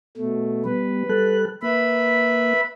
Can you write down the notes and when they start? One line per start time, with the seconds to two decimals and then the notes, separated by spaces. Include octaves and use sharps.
0.17 B2 A3
0.65 G3 B3 B4
1.09 G3 A4 F#6
1.63 A#3 B4 E5 B5